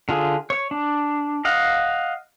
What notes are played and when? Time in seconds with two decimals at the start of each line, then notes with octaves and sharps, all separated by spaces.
0.09 D3 F4 G#4
0.50 C#5
0.71 D4
1.45 D#5 F5 F#5